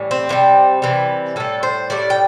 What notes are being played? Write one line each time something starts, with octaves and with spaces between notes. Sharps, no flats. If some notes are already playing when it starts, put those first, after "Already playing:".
Already playing: A2 E3 G3
C4
C3 E3 G3
C3 E3 G3
A2 G3 A4
C5
A2 G3 D5
G5